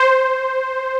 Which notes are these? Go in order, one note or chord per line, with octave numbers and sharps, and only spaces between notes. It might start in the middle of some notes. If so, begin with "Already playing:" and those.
Already playing: C5